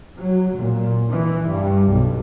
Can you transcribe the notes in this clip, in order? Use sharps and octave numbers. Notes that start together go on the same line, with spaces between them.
F#3
A#2
E3
G2
B1